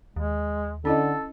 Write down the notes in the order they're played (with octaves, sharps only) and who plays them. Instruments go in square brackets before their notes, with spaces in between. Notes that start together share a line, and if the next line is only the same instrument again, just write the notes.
[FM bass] D#2 [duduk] G#3
[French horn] D3 [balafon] C#4 E4 D#5 [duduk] A4